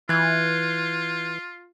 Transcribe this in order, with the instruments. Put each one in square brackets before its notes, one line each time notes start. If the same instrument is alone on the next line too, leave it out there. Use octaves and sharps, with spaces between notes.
[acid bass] E3 [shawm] F4 [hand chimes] F#6 G#6